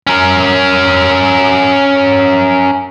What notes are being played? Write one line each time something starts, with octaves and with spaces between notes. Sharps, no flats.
C#4 A#4